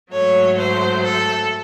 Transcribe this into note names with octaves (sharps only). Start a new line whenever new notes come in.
G#2 F#3 A3 C#5
C5
A4